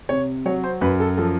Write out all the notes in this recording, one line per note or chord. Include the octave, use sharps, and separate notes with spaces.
C3 C#5
F#3 C#5
C5
F#2 B4
A4
F3 A4